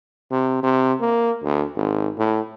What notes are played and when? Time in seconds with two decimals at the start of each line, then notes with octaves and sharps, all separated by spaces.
0.31 C3
0.63 C3
1.01 A#3
1.43 D2
1.76 G#1
2.18 A2